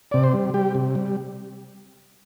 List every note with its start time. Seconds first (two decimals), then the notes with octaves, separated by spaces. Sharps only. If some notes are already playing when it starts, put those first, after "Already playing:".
0.11 C3 D5
0.24 C5
0.33 G3
0.54 G3 G4
0.75 C3
0.95 G3